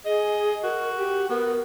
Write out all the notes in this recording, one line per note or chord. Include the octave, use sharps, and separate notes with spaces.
G#4 D#5
F#4 A#4
G4
B3 A#4